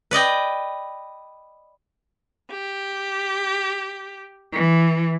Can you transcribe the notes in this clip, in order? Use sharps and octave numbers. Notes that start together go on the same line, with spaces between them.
B4 D5 D#5 G5
G4
E3